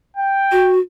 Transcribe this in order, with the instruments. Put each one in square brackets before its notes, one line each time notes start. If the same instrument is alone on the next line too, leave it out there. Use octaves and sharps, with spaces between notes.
[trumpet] G5
[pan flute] F#4